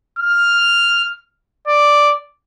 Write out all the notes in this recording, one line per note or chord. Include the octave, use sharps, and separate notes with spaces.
F6
D5